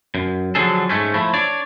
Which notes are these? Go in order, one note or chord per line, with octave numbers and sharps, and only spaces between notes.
F#2
D3 F3 F#3 D4 G#4 A4
G#2 G#3 A3 C#4
F3 A3 E4
D4 C#5 D5